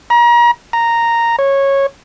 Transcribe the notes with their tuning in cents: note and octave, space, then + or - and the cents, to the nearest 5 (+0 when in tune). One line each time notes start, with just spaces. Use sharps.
A#5 +35
A#5 -5
C#5 -10